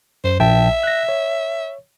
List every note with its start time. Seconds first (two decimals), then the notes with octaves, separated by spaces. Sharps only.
0.24 F#2 C5
0.40 A#1 E5 G5 A5
0.83 F#6 A#6
1.09 C#5